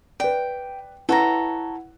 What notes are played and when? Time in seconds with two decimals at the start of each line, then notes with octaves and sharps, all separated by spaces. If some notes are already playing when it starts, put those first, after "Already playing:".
0.20 B4 D5 G5
1.09 E4 A4 B4 C#5 F#5 A#5